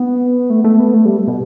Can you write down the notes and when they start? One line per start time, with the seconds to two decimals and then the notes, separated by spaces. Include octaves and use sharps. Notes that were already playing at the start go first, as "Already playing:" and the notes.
Already playing: B3
0.50 A3
0.64 A3
0.80 B3
0.94 A3
1.05 G3
1.28 B2